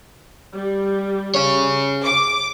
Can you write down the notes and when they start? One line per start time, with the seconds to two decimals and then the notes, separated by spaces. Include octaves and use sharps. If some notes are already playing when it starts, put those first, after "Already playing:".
0.56 G3
1.35 G#4 C#5
2.04 D6